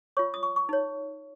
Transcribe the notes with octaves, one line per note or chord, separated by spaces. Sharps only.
F4 C#5 C#6
D#6
C#6
C#6
D#4 C#5